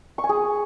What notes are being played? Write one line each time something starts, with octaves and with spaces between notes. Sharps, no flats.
C#6
G#5
G#4